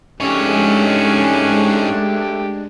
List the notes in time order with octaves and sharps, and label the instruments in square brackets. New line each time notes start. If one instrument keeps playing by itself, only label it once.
[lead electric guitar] G#2 C#5 [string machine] G#3 [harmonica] A3 D4 G4 [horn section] C#4